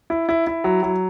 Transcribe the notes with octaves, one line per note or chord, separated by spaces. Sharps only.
E4
E4
E4
F#3
F#3